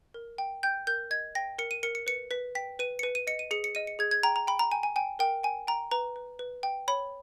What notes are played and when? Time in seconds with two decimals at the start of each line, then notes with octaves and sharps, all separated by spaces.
0.14 A#4
0.38 G5
0.63 G5 G6
0.87 A#4 G6
1.11 D#5 G#6
1.35 G5 A#6
1.58 A#4 C#7
1.71 D#7
1.83 A#4 C#7
1.95 C#7
2.07 B4 C#7
2.31 B4 B6
2.55 G5 B6
2.79 B4 D#7
2.99 C#7
3.03 B4 D#7
3.15 D#7
3.27 D#5 C#7
3.39 D#7
3.51 G#4 C#7
3.64 C#7
3.75 D#5 D#7
3.87 C#7
3.99 G#4 G#6
4.11 G#6
4.23 G5 A#5
4.36 A#5
4.47 G5 B5
4.59 A#5
4.71 G5 G#5
4.83 G#5
4.96 G5 G#5
5.19 A#4 G5
5.43 G5 G#5
5.67 G5 A#5
5.91 B4 A#5
6.16 B4
6.39 B4
6.63 G5
6.88 C#5 B5